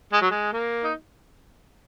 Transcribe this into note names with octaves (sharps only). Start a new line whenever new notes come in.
G#3
F#3
G#3
A#3
D#4